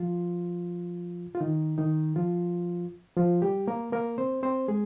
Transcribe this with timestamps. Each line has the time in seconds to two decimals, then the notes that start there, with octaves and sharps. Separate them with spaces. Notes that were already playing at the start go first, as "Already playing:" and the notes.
Already playing: F3 F4
1.35 F4
1.40 D#3 D#4
1.78 D#3 D#4
2.16 F3 F4
3.17 F3 F4
3.42 G3 G4
3.68 A#3 A#4
3.92 A#3 A#4
4.18 C4 C5
4.43 C4 C5
4.68 G#3 G#4